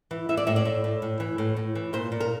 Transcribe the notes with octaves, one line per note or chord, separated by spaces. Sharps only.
E3
E3 E5
D5
A2 E5
D5
A2
A2
A2
E3
A2
A2
E3
A#2 C5
A#2
A#4